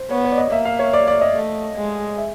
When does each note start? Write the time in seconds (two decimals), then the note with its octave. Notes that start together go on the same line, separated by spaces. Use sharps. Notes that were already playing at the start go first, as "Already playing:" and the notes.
Already playing: C5
0.11 B3 C#5
0.24 C#5
0.31 D5
0.38 D#5
0.52 A#3 E5
0.65 F5
0.79 C#5
0.93 D5
1.08 D5
1.21 D#5
1.36 A3
1.76 G#3
2.18 E5